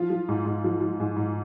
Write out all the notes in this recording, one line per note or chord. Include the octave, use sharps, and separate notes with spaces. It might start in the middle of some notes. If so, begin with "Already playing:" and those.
Already playing: F3 F4
F3
G#2
G#2
F3
F3
G#2
G#2